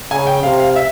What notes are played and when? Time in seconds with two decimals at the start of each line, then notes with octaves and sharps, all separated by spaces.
0.11 C#3 G#5
0.27 G5
0.43 C3 F5
0.60 F5
0.70 F5
0.76 E5